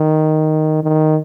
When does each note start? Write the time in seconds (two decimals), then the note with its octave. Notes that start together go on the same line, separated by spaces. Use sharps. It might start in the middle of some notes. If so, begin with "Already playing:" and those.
Already playing: D#3
0.83 D#3